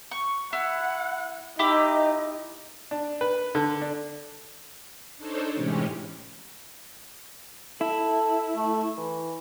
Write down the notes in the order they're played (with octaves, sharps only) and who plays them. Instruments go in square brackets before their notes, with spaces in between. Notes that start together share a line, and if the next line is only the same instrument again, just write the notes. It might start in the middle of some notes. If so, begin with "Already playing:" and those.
[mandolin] C#6
[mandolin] E4 [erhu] F#5
[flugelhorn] D#4 [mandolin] E4 G4 D6 [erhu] D#5
[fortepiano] D4
B4
D3
D4
[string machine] D4 D#4 A4 C5 C#5
A2 C3 E3 G#3 C#4 G4
[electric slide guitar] E4 [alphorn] A4
[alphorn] A3
E3